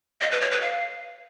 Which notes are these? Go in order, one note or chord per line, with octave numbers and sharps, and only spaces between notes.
D#5
B4
C#5
B4
F5